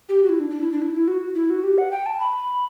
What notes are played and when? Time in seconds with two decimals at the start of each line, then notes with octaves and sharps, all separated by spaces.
0.09 G4
0.23 F#4
0.29 E4
0.40 D4
0.50 D4
0.61 E4
0.72 D4
0.82 E4
0.93 E4
1.08 F#4
1.35 E4
1.50 F#4
1.63 G4
1.78 F#5
1.91 G5
2.06 A5
2.20 B5